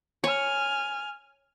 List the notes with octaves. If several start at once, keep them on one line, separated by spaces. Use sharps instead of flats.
C#5 G#5 F6